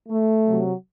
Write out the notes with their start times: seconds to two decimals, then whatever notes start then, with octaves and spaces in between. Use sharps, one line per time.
0.09 A3
0.46 C3 F#3